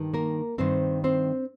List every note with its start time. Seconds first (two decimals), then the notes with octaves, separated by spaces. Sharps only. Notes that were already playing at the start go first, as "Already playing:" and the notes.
Already playing: G2 D#3
0.14 A#3 A#4
0.58 G2 D#3 C4 C5
1.04 C4 C5